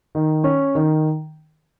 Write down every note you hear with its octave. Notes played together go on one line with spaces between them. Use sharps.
D#3
C#4
D#3